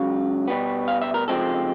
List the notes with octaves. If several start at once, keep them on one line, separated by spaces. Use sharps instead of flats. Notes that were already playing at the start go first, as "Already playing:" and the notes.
Already playing: C#2 C#3 F#3 F5
B2 G3 B3
F5
E5
A#4
C#2 C3 F3 G#3 C4 A4